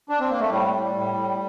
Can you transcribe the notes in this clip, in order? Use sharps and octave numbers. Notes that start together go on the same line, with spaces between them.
D4
C4
A#3
A3
A2 G3
A2
A2
A2